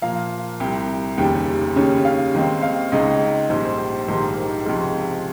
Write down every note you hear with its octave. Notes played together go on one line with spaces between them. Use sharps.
A#2 F3 A#3 F4 F5
C2 C3 G3 G5
F1 D#2 C#3 G3 G5
D#2 C#3 G3 C#4
F5
D#2 D#3 G#3 C4
F5
C#2 C#3 G#3 D#4 D#5
A#1 G#2 G3 C5
C5
C5
A#1 G#2 D#3 G3 A#3 C5
A#4
C#2 C3 F3 G#3 C5